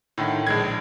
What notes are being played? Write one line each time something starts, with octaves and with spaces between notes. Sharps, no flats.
A2 D3 D#3
A#1 G#3 G#6